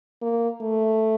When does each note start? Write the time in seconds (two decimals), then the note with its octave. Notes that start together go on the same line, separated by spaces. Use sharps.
0.22 A#3
0.61 A3